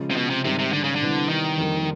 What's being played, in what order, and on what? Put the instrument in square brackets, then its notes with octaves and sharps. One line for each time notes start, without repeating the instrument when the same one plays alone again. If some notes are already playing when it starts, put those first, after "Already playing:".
Already playing: [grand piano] C#3 F3 G#3 C#4
[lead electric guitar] C3
B2
C3
[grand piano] G#2 D#3 G3 [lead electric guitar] C3
[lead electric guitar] C3
D3
C#3
D3
[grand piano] C3 E3 G3 B3 E4
[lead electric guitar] D#3
[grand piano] F2 D3 G3 A#3